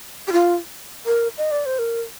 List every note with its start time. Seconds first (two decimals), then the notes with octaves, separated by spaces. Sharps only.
0.27 G4
0.32 F4
1.06 A#4
1.38 D#5
1.51 D5
1.66 C5
1.79 A#4